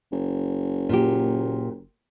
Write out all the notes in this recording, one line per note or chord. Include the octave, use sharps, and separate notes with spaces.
F#1
A#2 G4